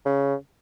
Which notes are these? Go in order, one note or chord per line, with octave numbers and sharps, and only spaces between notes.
C#3